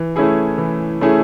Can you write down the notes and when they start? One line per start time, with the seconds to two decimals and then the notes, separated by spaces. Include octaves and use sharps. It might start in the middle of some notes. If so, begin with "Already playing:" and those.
Already playing: E3
0.16 A3 C#4 E4 G#4
0.58 E3
1.01 A3 C#4 E4 G#4